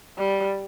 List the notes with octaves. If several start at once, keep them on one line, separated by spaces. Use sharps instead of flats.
G3